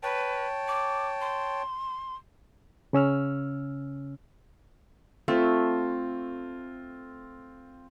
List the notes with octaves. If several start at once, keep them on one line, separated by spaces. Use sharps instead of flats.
B4 C#5 G5 A5
D6
C6
C#3 C#4 E6 F6
A3 C4 F4